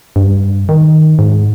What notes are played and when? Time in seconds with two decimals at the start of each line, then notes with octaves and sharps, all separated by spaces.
0.16 G2
0.69 D#3
1.19 G#2